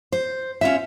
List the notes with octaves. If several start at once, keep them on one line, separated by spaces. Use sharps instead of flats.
C5
C#4 F4 E5